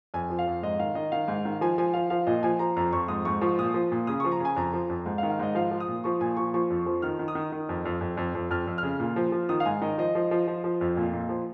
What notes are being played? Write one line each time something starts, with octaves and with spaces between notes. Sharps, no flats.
F2 G#5
F3
F5
F2
G#2 D#5
D#3 F5
D#3 D#5
D#3 F5
G#2
D#3
F3 G#5
F3 G#5
F3 F5
F3 F5
A#2 D#5
F3 G#5
F3 A#5
F2 A#5
F2 C#6
G#2 D#6
G#2 C#6
F3 C#6
A#2 D#6
F3
A#2
C#3 D#6
F3 C#6
A#5
C#3 G#5
F2 A#5
F3
F2
G#2
F5
D#3
F5
G#2 D#5
F3 F5
F3
D#6
A#2
F3 C#6
A#2 G#5
F3 C#6
F3 C#6
F2
F3
D#3 F6
D#3
D#6
D#3
D#3
F2
F2
F2
F2
F2
F2 F6
F2
C#3 F6
A#2
F3
F3
D#3 D#6
F5
G#2 G#5
D#3 D#5
F3 D#5
F3
F3
F3
F3
F2
A#2
A#2
F3